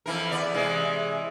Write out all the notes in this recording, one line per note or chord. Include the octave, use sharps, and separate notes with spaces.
F2 E3 A#4
E2 B3 D5
C3 E3 G#3